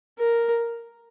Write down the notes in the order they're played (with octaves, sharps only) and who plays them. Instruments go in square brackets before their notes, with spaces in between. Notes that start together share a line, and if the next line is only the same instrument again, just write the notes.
[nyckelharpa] A#4